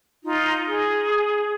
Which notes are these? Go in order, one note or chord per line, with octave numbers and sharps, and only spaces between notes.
D#4 F4
G#4